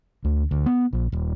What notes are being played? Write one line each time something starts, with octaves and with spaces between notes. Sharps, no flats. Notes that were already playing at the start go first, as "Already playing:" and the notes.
D2
D2
B3
A#1
D#1